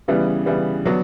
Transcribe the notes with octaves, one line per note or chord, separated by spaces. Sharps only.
C#3 E3 G3 B3
C#3 E3 G3 B3
D3 F#3 B3 D4